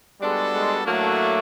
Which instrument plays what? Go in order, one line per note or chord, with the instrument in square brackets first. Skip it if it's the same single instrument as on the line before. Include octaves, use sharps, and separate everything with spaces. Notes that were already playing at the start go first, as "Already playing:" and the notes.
[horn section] G3 B3 D4 F#4 A4 [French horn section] G#3
[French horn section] G#3
[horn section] A2 F#3 A#3 D4 F#4 [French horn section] A3